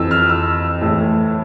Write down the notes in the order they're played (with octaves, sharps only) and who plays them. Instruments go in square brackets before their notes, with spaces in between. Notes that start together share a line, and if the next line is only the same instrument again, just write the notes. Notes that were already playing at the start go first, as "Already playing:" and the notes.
Already playing: [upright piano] F2 E3 E6
F6
E6
A2 E3